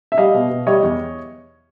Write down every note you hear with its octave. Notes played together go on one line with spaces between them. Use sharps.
E5
G3 D#5 F5
B2
B2
G3 C#5 D#5
E2